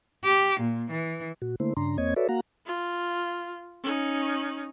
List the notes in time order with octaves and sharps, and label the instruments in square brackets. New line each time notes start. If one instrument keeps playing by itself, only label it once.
[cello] G4
A#2
E3
[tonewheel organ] A#2 F#4
D3 A3 A#3 E4 C5
G2 C#3 D4 A#5 C6
E2 A#3 C4 C#5 D#5 G#6
F#4 A4 B4 C#5 D5 E5
A#3 F#4 F5 F#5 A#5
[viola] F4
C#4 D#4